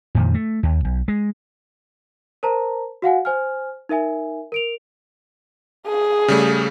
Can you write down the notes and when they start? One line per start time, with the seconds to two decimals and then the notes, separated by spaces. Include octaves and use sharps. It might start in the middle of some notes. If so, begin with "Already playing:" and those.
0.15 F2 A#2 D#3
0.34 A3
0.63 D#2
0.85 B1
1.08 G#3
2.43 A#4 C5 A5 A#5
3.02 F#4 F5 F#5 G#5
3.25 C5 G#5 F6
3.89 D#4 A#4 E5 G#5
4.52 A#4 D7 F7
5.87 G#4
6.28 C#3 G3 A3